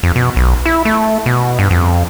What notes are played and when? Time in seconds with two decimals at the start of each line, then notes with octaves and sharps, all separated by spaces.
0.03 F2
0.16 B2
0.36 B1
0.66 E4
0.85 A3
1.26 B2
1.59 G2
1.71 F2